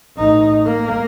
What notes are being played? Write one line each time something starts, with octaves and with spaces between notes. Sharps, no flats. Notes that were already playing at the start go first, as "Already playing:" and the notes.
A1 D#4
A#3